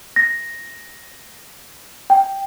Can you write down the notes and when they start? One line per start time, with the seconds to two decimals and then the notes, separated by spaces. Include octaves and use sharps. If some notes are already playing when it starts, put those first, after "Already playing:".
0.16 A#6
2.10 G5